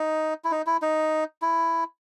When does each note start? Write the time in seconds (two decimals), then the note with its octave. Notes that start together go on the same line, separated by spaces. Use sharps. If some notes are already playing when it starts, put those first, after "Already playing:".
Already playing: D#4
0.44 E4
0.51 D#4
0.67 E4
0.82 D#4
1.42 E4